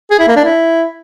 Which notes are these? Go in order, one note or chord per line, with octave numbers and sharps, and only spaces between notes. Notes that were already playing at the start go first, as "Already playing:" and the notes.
G#4
E4
A#3
D4
E4